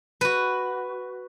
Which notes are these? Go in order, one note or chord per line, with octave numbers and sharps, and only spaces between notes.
F#4 B4